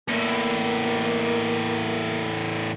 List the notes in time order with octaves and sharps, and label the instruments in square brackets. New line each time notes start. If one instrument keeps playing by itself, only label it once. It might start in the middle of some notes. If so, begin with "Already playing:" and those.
[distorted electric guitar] E2 A2 [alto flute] A#3